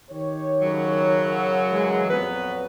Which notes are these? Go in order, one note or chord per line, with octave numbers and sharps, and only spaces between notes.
D#3 G4 C#5
F#2 C#3 F#3
E3 G#3
F2 A#2 F#3 B3 B4